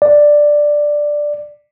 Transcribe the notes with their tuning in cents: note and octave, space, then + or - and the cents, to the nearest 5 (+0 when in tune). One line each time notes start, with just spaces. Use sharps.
D5 +5